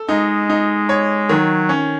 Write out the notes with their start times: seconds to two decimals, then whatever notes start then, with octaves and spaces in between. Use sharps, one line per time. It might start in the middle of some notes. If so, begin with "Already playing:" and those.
Already playing: A4
0.09 G#3 D#4
0.49 D#4
0.89 C#5
1.29 D#3 F#3
1.69 C#4